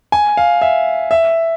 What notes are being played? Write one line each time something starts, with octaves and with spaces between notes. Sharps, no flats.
G#5
F5
E5
E5